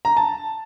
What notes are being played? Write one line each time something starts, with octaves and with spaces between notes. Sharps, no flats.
A#5
A5